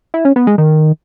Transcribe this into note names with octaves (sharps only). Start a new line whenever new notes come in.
E4
C#4
B3
G#3
D#3